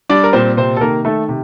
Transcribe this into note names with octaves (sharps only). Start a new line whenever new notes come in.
G3 D4 D5
A#4
A#2 C4 C5
C3 C4 C5
A4
D#3 A#3 A#4
D#3 A3 A4
C3